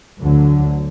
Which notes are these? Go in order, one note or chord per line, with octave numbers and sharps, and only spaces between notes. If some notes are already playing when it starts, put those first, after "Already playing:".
D2 D3 F#3